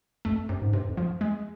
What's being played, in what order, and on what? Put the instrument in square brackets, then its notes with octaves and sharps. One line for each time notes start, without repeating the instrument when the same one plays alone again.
[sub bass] F2 [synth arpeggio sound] A3
[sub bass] F#2 [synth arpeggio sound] C3
[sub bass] G#2
[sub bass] G2 [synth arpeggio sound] C3
[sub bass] F2
[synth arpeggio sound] F3
G#3